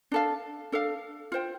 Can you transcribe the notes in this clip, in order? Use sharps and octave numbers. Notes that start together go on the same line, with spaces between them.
D4 A4 F5
D4 A4 F5
F4 C5 G5